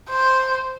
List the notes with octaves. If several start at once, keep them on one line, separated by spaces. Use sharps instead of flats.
C5